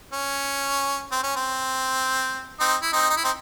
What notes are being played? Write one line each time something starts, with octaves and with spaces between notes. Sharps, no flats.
C#4
C4
C#4
C4
C4 D#4
E4
C4 D#4
D#4
E4
C4 D#4